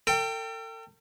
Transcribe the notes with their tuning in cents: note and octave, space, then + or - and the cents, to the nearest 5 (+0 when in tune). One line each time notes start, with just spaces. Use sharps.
A4 +45 G5 +0